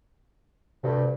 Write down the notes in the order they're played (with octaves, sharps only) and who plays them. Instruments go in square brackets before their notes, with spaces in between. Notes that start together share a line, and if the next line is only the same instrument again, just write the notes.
[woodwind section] D2 G2 [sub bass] C3